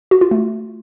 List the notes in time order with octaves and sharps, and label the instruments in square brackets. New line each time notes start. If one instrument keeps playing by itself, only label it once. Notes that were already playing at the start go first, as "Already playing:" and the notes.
[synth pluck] F#4
F4
A3